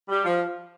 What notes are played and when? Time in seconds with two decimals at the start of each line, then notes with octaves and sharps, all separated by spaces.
0.08 G3
0.24 F3